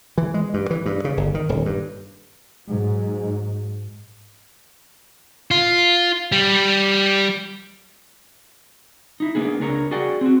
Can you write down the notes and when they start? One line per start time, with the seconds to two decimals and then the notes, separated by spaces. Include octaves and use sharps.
0.18 E3
0.34 G#3
0.54 G2
0.70 E3
0.86 G2
1.05 C#3
1.17 G1
1.34 D#3
1.49 D#1
1.66 G2
2.66 G#2 F#3
5.51 F4
6.32 G3
9.20 D#4 E4
9.35 A#3 B3 D4 G#4
9.60 C#2 D4 A#4 C#5 A#5
9.91 F#4 G#4 D5 F#5 G5
10.21 C4 F#4